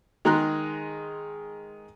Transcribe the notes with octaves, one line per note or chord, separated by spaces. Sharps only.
D#3 G#3 G#4 A#5 C6 F#6